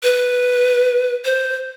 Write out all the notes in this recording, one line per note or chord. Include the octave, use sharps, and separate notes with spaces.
B4
C5